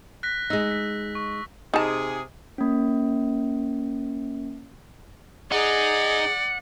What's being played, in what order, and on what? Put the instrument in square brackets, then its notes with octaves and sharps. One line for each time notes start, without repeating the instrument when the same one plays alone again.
[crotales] F#6 A#6 B6
[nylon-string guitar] G#3 D#4 [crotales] E6 A#6
[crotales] B6
C#6
[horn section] C3 G#4 [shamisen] D#4 A5
[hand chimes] A#3 C#4
[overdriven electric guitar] D#4 [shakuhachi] G#4 [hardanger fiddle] D5 [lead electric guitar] F#5